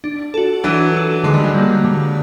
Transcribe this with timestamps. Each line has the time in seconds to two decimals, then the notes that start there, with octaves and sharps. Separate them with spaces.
0.04 D4
0.34 F#4 A4
0.64 E3 F#3 D4
0.94 F#4 A4
1.24 D3 G#3
1.34 G3
1.44 F#3 G#3
1.54 G3 A#3
1.85 D3